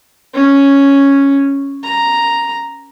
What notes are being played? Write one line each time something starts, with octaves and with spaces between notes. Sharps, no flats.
C#4
A#5